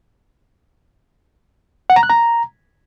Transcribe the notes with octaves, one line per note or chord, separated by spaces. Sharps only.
F#5
A#5
F#6
A#5